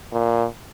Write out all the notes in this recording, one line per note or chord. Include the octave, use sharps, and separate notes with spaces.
A#2